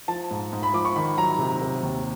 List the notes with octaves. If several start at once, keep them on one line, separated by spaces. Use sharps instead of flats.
F3 A5
G#2
G#2
B5
F3 D6
C#6
D#3 B5
F#3 A#5
C3
C3
D#2